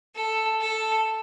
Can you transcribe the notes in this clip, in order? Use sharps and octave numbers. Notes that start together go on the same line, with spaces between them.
A4
A4